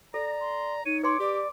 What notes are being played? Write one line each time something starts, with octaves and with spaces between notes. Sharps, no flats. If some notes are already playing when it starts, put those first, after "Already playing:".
A4 D5 A#5 A#6
C6
D#4 C#5 D#7
B4 C#5 C6 D6
G4 D5